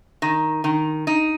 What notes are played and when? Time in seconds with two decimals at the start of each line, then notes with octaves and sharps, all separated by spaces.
0.22 D#3
0.64 D#3
1.07 D#4